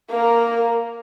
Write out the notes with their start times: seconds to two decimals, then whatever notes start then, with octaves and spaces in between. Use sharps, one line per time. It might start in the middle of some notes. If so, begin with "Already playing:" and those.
0.10 A#3 A#4